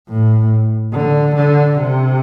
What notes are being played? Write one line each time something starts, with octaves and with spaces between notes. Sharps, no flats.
A2
D3
D3
C3